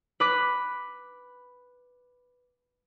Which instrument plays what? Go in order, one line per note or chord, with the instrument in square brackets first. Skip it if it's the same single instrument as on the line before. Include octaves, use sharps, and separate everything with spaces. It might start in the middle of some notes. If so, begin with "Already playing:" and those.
[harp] B4 B5 D6 F#6 B6